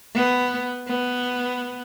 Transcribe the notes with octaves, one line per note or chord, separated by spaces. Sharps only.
B3
B3